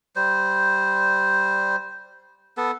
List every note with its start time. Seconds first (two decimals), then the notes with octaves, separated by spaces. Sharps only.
0.16 G3 C5
2.57 B3 A4